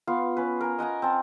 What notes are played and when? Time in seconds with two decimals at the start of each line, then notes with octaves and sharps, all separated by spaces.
0.07 B3 F4 F5
0.37 C#4 B4
0.61 A#4 G#5
0.79 D#5 F#5 G#5 A#5
1.02 C4 A5